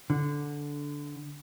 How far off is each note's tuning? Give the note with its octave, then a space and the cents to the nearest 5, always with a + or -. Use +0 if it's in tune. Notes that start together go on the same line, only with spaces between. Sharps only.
D3 -10